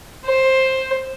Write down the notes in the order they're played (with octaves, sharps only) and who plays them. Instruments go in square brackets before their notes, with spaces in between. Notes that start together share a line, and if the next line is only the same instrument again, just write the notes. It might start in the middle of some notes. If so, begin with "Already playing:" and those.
[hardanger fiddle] C5